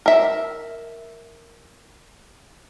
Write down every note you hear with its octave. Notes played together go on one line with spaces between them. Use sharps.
A#4 E5